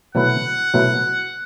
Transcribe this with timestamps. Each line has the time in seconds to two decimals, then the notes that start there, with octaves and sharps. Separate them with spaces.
0.15 B2 F#3 A3 E4 B4 F#5
0.74 B2 F#3 A3 E4 B4